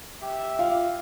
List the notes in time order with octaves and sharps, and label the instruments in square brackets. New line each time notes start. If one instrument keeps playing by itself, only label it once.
[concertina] G4 [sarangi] E5
[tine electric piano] F4 [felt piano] F5